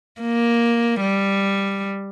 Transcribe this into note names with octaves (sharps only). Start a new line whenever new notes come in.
A#3
G3